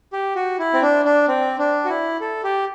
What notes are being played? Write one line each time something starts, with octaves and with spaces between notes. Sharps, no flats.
G4
F#4
E4
C4
D4
D4
C4
D4
F#4
E4
A4
G4